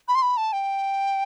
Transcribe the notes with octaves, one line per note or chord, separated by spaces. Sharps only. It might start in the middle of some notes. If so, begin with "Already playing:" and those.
B5
C6
B5
A5
G5